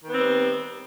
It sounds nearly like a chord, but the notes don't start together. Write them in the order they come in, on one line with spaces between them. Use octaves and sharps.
D#3 B3 C4 G3